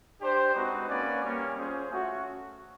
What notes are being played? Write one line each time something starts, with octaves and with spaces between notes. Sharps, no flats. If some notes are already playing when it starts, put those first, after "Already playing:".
D4 G4 C5
G#3 C4 D#4 F#4 B4
A#3 C#4 F#4 B4 D5
G3 A#3 C#4
C#4 F4 G#4 C5
A3 C#4 F#4